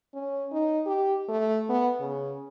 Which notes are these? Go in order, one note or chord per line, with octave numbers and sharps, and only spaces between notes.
C#4
D#4
G4
A3
B3
C#3